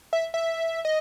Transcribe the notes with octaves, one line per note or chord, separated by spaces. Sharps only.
E5
E5
D#5